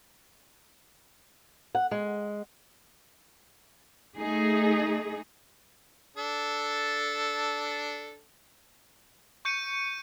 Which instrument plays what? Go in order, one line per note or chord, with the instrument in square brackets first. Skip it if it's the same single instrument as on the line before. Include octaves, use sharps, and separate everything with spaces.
[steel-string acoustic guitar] F#5
G#3
[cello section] A3 D#4 G#4
[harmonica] D4 A4
[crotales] C#6 G6 C#7 D#7